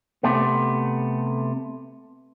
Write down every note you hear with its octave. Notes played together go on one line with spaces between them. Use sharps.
C3 A3 B3